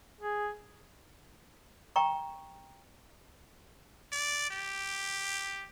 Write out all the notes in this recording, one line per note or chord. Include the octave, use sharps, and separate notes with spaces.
G#4
G5 A#5 C#6
D5
G4